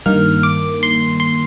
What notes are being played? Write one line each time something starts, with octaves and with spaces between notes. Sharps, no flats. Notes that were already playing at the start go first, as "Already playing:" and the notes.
G2 D#3 A#3 F6
D6
C6
C6